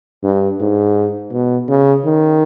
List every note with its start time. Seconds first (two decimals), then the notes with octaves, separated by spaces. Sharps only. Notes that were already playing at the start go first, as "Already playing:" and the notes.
0.23 G2
0.60 G#2
1.32 B2
1.68 C#3
2.05 D#3